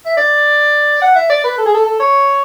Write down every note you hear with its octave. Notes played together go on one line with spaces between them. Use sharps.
E5
D5
F#5
E5
D5
B4
A4
G#4
A4
A4
C#5